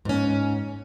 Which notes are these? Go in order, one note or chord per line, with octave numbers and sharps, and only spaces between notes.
G#2 C#4